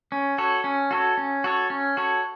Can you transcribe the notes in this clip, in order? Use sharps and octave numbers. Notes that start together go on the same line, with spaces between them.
C#4
F#4 A4 C#5
C#4
F#4 A4 C#5
C#4
F#4 A4 C#5
C#4
F#4 A4 C#5